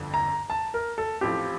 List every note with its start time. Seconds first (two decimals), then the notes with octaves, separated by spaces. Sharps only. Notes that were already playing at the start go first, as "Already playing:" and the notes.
Already playing: G1 F2 D3
0.14 A#5
0.50 A5
0.74 A#4
0.98 A4
1.21 A1 A2 F3 C4 F4 G4